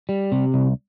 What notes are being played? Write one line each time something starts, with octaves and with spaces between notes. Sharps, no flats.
G3
C3
C2